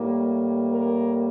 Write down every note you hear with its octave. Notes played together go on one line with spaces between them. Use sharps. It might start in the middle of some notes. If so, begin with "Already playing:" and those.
Already playing: A2 G3 A#3
A#4